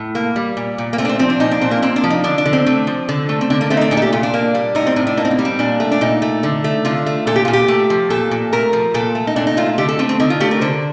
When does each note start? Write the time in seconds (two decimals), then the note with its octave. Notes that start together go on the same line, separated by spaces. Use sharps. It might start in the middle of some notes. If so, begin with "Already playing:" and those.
Already playing: A2
0.15 A#3
0.36 G3
0.57 A#2
0.78 A#2
0.93 A#3
0.98 A3 C4
1.05 D4
1.09 C4
1.19 F3 C4
1.30 D4
1.40 A#2 D#4
1.51 D4
1.61 A#2 C4
1.71 A#3
1.82 A#3 C4
1.96 D4
2.04 F3
2.10 D#4
2.24 D3 D4
2.38 D4
2.46 D3
2.53 C4
2.66 A3
2.87 F3
3.09 D3
3.29 A3
3.41 C4
3.50 D3 D4
3.61 A#3
3.70 A3 C4
3.77 D#4
3.81 D4
3.91 A#2 D#4
3.97 A4
4.02 G4
4.12 A#2 F4
4.23 D4
4.34 A#3
4.55 G3
4.75 A2 D#4
4.87 C4
4.96 A2 D4
5.07 D4
5.17 A#3 D#4
5.25 C4
5.31 A#3
5.39 G3
5.45 C4
5.59 A#2 D4
5.80 A3
5.91 D4
6.01 A#2 D#4
6.22 A3
6.43 D3
6.64 A3
6.85 D3 F4
7.06 A3
7.27 A#2 A4
7.36 G4
7.45 A#2 F4
7.53 G4
7.68 A3
7.90 F3
8.10 A#2 A4
8.31 A#2
8.53 A3 A#4
8.73 F3
8.94 A#2 A4
9.15 A3
9.27 D#4
9.36 A#2 D4
9.47 D#4
9.57 A3 F4
9.78 D3 G4
9.89 A4
9.99 A3 C4
10.09 C4
10.20 D3 D#4
10.30 F4
10.40 A3 G4
10.51 A#4
10.61 D3 C5